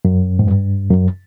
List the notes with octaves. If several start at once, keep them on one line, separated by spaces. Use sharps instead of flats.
F#2
G#2
G2
F#2